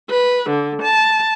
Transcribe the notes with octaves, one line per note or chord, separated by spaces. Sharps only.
B4
D3
A5